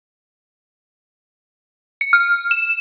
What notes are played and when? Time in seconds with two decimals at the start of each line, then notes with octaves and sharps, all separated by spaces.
2.01 C#7
2.13 F6
2.51 E7